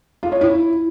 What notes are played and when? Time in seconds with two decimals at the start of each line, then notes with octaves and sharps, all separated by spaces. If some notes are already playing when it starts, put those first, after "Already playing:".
0.23 F4
0.32 C#5
0.41 E4